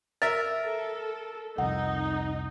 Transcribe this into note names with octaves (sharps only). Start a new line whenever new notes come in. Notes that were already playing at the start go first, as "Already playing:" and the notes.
A#4 E5 A6
A4
C2 F2 D#4 F#5